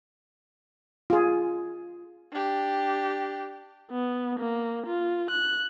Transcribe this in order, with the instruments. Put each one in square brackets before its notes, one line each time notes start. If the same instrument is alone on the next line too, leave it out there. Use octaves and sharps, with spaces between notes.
[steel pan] F4 G#4
[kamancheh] D4 G4
[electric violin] B3
A#3
F4
F#6